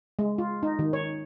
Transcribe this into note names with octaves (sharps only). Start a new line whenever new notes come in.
G#3
F4
D#4
D#3
C#5